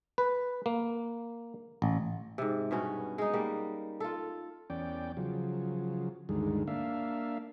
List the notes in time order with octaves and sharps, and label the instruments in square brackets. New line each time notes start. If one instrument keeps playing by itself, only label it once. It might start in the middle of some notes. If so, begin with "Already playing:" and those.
[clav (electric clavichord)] B4
A#3
A1
[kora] G#2 C3
G2 B2 C#4 F#4
G#3 D#4
G3 A#3 F#5
F4 A4
[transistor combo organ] E2 C#4 D5 G5
C#3 F3 F#3
D2 G2 D#3 G#3
A#3 D4 E5 F5